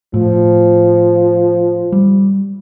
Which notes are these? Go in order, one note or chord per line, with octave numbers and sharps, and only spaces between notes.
A2 F3
G3